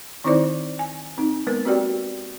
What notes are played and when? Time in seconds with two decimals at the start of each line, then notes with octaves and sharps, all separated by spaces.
0.24 D#3 C4 D#4 E4 C5 D5
0.79 G#5
1.18 C4 D#4
1.47 G#3 A#3 B3 A#4 B4
1.65 C4 F#4 G4 D5 G5